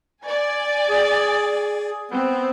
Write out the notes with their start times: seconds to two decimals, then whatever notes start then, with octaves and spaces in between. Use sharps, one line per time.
0.24 D5 G#5
0.89 G#4
2.11 B3 C4